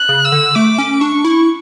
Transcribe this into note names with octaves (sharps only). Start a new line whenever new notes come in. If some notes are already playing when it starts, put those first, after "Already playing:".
Already playing: F#6
C#3
E6
D3
A3 D6
C#4
D4 C#6
E4